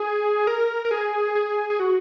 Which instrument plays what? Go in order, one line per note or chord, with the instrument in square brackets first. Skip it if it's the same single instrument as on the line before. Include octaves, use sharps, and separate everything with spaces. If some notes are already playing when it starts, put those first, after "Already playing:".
Already playing: [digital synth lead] G#4
A#4
A#4
G#4
G#4
G#4
F#4